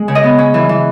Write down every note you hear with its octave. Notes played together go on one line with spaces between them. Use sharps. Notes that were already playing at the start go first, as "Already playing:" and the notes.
Already playing: G#3
C#3
D#5
B3
C#4
E3
E3